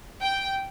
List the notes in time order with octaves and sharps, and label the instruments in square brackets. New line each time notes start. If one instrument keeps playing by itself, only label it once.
[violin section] G5